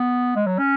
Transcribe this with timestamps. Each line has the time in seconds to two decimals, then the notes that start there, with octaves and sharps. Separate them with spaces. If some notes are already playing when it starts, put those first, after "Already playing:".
Already playing: B3
0.36 G#3
0.47 F#3
0.58 C#4